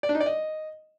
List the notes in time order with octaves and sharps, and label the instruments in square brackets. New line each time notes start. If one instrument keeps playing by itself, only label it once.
[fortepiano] D5
D4
D#4
D5
D#5